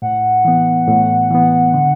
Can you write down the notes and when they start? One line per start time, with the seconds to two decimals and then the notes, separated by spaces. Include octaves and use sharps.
0.02 A2 F#5
0.45 E3 B3
0.88 A2
1.30 E3 B3
1.74 D3